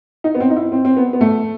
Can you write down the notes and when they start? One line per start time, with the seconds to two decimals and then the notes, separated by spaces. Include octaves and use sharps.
0.24 D#4
0.35 B3
0.40 C4
0.50 D#4
0.57 E4
0.72 C4
0.85 C4
0.97 B3
1.13 B3
1.21 A3